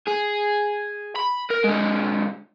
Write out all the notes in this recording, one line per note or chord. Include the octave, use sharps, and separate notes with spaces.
G#4
B5
A#4
D3 G#3